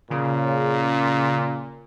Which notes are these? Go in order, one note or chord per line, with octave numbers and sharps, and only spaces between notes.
A#2 C#3